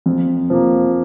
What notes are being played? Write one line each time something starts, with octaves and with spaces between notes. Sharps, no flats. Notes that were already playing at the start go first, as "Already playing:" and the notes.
F2
F3 A#3